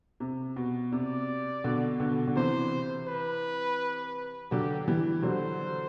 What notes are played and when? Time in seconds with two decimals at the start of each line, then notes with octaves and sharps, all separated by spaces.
0.20 C3
0.56 B2
0.92 C3 D5
1.64 B2 D3
2.00 B2 D3
2.27 D3
2.36 C3 E3 C5
3.08 B4
4.51 D3 F#3 G4
4.88 E3 G3
5.23 D3 F#3 C5